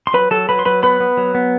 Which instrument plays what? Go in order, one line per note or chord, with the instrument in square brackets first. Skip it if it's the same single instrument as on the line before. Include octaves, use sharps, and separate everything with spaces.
[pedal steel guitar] C6
F#3 B4 B5
F#3 A4 A5
F#3 B4 B5
C6
F#3 B4 B5
B3 B4 B5
B3
F#3
B3